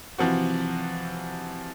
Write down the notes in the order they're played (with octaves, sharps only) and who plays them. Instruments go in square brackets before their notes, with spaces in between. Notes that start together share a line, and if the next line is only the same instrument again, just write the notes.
[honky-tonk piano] C3 E3 F3 C4 F#4